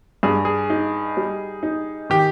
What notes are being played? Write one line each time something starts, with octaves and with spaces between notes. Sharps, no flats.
G2 G#4
G#4
D#4
G3
D#4
D#3 G4